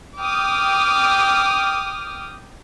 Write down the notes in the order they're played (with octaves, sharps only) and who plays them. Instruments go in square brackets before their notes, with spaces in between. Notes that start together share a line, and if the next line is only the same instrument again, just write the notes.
[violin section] G5 D6 D#6 F6